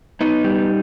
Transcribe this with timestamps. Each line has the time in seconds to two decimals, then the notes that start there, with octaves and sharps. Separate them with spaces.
0.21 B3 D#4
0.44 G3